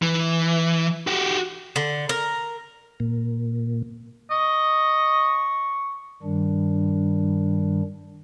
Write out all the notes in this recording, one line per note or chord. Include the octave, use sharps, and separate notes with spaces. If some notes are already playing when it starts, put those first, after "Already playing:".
E3
F#4 G4
D3
A#4
A#2
D#5 C#6
G2 D#3 G3 D4